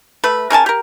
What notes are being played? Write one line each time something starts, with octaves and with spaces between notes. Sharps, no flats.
A3 B4
C#3 A#4 G#5 A5
G4 A#4